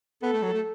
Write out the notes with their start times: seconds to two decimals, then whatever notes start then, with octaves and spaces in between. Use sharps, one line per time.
0.22 B3 A4
0.33 A3
0.43 F#3
0.53 A3